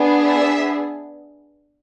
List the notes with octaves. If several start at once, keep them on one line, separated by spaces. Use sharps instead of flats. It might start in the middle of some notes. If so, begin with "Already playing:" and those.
Already playing: B3 D4 G#4
E5